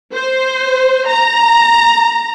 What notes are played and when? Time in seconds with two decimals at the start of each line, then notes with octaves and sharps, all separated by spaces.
0.14 C5
1.07 A#5